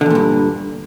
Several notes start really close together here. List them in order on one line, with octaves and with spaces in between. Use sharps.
D3 E2 A#2 G2